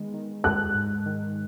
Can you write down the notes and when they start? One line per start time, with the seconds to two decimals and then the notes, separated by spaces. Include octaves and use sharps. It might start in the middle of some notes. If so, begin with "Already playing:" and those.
Already playing: D#3 G#3 B3
0.14 D#3
0.44 G#3 F#6
0.74 G#2
1.06 D#3